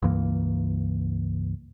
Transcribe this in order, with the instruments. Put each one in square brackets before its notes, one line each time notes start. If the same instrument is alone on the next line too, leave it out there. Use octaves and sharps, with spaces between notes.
[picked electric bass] C#2 G2 E3 A#3